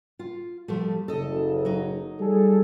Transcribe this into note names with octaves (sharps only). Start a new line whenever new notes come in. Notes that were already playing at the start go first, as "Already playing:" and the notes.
F4
F3 G3 A3
F#1 A4 D#5
F#3 D#4
G3 G#4 A4